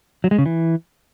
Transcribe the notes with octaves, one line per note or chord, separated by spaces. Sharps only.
F#3
G#3
C#3
E3